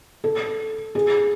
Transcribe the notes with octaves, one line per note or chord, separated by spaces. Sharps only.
A4
G#4